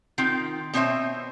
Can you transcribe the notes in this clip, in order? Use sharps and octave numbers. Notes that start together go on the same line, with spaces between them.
D#3 C4 F4 G5
B2 C4 C5 C#5 E5